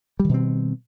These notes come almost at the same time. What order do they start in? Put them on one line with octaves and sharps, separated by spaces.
G3 D#3 B2 C4